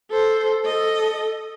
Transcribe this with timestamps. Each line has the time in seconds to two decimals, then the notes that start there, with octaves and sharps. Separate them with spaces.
0.10 A4 C5
0.65 A4 D#5